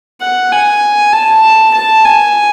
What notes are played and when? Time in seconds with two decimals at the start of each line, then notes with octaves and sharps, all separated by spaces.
0.21 F#5
0.52 G#5
1.13 A5
1.74 A5
2.04 G#5